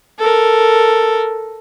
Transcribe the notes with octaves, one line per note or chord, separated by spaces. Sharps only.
A4 A#4